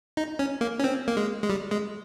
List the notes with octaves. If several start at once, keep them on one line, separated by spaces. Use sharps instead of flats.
D#4
C#4
A#3
C#4
C4
A#3
G#3
G#3
G3
G#3